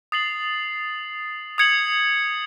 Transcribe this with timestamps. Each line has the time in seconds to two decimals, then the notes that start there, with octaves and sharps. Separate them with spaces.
0.12 D#6 A6 C7 F#7
1.58 D#6 G#6 C#7 F#7